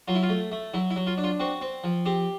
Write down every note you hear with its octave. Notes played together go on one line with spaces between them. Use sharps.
F#3 F4
E4
F4
A3
A3
F#3 E4
E4
F#3
F4
D4
F4
C4 F#4
C4
F3
C4 G4